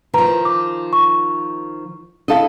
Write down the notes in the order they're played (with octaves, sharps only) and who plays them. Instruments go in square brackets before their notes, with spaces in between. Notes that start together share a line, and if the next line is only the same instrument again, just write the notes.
[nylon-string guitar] D#3 F3 [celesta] B4 A#5
[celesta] D6
C#6
[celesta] D4 F5 [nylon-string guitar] E4 A4 D#5